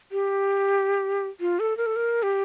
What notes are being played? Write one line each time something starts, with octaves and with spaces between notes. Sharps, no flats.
G4
F4
A4
A#4
A4
A#4
G4